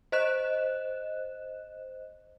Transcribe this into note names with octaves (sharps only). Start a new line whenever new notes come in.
C5 D#5 F#6 E7